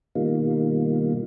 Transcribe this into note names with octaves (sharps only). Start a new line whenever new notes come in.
B2 D#3 G3 A#3 D#4 F4